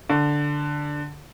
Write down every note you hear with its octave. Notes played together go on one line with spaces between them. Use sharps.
D3